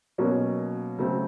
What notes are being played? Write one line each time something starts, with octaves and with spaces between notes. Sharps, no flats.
B2 F#3 A#3 C#4
C#3 F#3 A3 C4